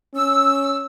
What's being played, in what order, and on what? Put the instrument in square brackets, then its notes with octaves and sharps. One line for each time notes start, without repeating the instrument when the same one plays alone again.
[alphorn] C#4 [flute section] E6